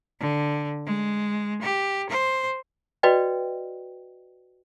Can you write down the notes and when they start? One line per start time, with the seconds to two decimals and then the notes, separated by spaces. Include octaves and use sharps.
0.20 D3
0.86 G#3
1.62 G4
2.10 C5
3.03 F#4 B4 D5 D#5 G5